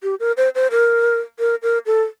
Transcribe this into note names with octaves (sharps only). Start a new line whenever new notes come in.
G4
A#4
C5
C5
A#4
A#4
A#4
A4